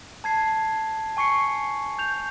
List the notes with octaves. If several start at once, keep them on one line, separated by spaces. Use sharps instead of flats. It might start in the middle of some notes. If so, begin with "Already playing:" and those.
A5 G#6 C7
G#5 C#6 C7 C#7
G6 F7